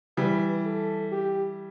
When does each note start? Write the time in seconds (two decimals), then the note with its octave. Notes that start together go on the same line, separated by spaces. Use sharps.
0.17 E3 G3 B4
0.66 A4
1.12 G4